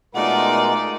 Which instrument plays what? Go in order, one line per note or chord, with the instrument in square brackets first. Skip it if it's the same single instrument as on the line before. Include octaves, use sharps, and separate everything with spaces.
[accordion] B2 G#3 F#5 [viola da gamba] A3 D#4 D5 [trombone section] F4 A#4